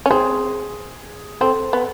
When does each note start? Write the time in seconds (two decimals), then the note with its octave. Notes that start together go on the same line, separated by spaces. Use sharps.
0.06 C#4
0.10 C4 G#4
1.41 C4 A4
1.73 B3